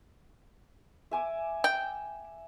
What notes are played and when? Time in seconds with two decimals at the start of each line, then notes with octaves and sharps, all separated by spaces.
1.11 E5 G#5 D6
1.64 G5